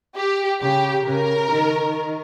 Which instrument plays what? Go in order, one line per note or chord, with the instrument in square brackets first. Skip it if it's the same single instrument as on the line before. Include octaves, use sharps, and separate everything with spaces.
[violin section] G4
[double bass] C#3 [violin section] G4
[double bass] C#3 [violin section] A#4
[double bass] D#3